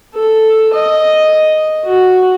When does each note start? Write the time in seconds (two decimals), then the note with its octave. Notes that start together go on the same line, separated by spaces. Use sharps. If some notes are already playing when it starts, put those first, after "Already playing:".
0.14 A4
0.73 D#5
1.85 F#4